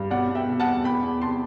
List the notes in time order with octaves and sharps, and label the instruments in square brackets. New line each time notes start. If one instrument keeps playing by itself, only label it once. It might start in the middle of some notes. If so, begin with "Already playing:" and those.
Already playing: [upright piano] G2
B2 D5 F#5
B2
E5 G5
B2
F#5 A5
E2
E2 G5 B5
E2
C3 A5 C6